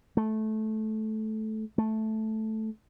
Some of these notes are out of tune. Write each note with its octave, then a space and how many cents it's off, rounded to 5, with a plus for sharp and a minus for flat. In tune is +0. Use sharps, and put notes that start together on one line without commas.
A3 -15
A3 -5